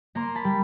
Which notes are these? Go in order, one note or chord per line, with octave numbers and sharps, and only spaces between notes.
A#3 A#5 C6
A5 B5
G3